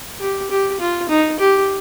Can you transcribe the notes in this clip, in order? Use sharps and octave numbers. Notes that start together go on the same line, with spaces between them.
G4
G4
F4
D#4
G4